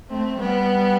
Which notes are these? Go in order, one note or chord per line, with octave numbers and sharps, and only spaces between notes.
A3 C4
G3 B3